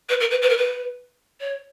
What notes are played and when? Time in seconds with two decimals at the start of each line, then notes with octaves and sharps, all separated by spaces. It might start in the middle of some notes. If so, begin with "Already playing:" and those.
0.09 B4
0.20 A#4
0.31 B4
0.42 B4
0.49 A#4
0.57 B4
1.41 C#5